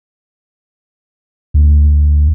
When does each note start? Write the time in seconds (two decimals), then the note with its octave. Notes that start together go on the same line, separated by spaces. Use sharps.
1.54 D2